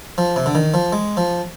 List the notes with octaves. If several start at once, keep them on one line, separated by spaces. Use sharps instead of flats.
F3
C3
D3
D#3
F3
G#3
F3